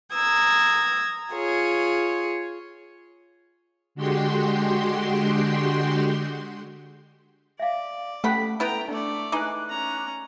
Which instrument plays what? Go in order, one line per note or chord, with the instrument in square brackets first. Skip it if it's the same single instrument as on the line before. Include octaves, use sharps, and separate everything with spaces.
[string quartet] A#5 D#6 E6 G#6
F4 G#4 C#5
[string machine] D3 G#3 F#4 G4 G5 C6
[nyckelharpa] D5 [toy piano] E5 F5
[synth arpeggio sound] A3 [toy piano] C#4 A4 [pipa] G4 F#5 B5
[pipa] B3 E4 [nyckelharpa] G5 A#5
[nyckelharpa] A3 D5 [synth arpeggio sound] D4
[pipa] E3 G#3 D#4 [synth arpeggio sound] D6 F#6
[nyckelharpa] C#4 A#5